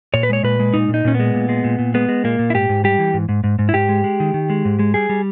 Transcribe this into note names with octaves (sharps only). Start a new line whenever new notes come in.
A#2 C#5
B4
G#3 C#5
A#2 B4
G#3
A#2 D#4
A#2
D#4
A#2 C#4
B3
G#3
A#2
G#3
A#2
A#2
G#3 B3
G#3
A#2 A#3
A#2
E4
G#2 G4
G#2
G3 G4
E3
G#2
G#2
G#2
G#2
E4
G#2 G4
G#3
G#3
D#3
D#3
G#3
G#2
G#3
G3 G#4
G3